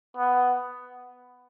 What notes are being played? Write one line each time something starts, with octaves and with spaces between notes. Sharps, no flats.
B3